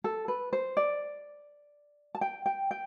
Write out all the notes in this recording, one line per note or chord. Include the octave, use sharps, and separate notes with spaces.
A4
B4
C5
D5
A5
G5
G5
G5